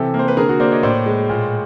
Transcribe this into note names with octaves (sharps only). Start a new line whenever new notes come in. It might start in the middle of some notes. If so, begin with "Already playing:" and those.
Already playing: C3 E3 G4 A4
A#3
C5
B4
D3 G#4 A#4
F#4 G#4
A#3 C5 D5
C#5 D#5
A2 C5 D5
G#3
A#2